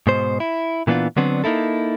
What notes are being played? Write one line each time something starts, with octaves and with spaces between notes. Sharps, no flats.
G#2 B2 C5
E4
A#2 E3 B3 D4 F4
D3 F#3 B3 C4 D4
A#3 D#4 E4 A4